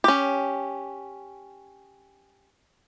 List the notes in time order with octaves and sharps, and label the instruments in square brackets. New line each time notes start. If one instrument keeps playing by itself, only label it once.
[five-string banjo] C#4 G4